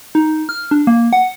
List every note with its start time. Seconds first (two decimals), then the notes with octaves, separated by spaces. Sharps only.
0.15 D#4
0.49 F6
0.71 D4
0.87 A#3
1.13 F#5